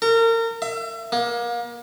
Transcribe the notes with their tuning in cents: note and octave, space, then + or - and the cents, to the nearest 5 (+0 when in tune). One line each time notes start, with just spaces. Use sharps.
A#4 -30
E5 +35
A#3 +30